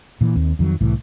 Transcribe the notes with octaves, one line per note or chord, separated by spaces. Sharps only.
A#2 E3
D#2 C4
F2 D#3 F#3
C2 A2 E3